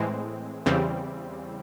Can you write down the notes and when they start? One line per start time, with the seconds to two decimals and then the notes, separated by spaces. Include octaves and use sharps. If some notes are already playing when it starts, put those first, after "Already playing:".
Already playing: A2 E3 G#3 C4
0.66 E2 C#3 E3 G3 C4